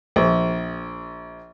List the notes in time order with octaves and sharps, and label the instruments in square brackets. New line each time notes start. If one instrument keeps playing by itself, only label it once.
[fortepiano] A#1